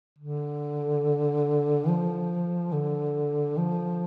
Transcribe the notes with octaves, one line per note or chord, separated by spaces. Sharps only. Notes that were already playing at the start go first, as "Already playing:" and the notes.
D3
F3
D3
F3